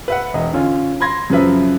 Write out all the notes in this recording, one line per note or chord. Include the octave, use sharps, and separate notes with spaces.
B4 E5 F#5
E1 D#5
D3 C#4 F4
B5 C6 G#6 A#6
F#2 C#3 F3 B4 E5